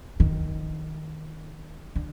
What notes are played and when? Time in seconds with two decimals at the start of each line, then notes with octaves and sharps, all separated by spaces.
0.20 D#3
1.96 D3